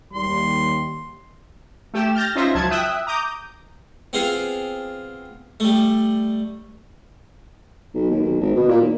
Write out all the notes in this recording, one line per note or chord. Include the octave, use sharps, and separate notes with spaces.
D#2 G3 C6
A3 G4 G5 E7
F6 G6 A6 A#6
C#4 D#4 F4 C5 E5 A#6
C#2 F3 F#3 A5 G#6
E5 G5 D#6 E6 F#6
A#5 D6 D#6 G6
B3 C4 F4 G#4 F5
G3 A3
B1
D#2
B1
G#1
B2
A#2
D#2